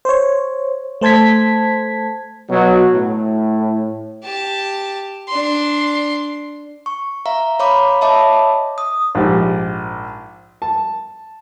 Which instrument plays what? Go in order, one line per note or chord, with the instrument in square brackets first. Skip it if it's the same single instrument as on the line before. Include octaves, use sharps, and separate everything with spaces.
[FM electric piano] C5 C#5
A3 C5 A5 G#6 B6
[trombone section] B2 F#3
A2
[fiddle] G4 A5
D4 C6
[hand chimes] C#6
E5 F5 A#5
C#5 F5 A#5 B5 D6
C#5 D#5 E5 A5 B5 D6
D#6
[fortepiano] A#1 G#2 G4
A5